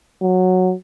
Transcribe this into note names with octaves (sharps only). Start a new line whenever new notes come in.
F#3